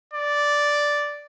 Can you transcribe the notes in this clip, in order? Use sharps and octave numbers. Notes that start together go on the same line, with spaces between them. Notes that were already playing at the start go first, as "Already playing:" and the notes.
D5